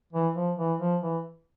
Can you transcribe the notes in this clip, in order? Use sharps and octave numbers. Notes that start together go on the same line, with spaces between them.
E3
F3
E3
F3
E3